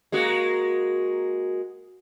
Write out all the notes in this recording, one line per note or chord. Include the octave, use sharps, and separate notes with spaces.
G#3 A#3 F#4